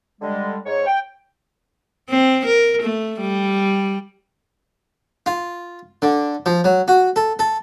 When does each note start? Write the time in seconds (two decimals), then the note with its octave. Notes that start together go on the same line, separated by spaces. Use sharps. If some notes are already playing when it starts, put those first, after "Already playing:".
0.21 D3 G3 G#3
0.66 G#2 C#5
0.86 G5
2.09 C4
2.46 A#4
2.83 A3
3.20 G3
5.26 F4
6.02 D3
6.46 F3
6.64 F#3
6.88 F#4
7.16 A4
7.39 A4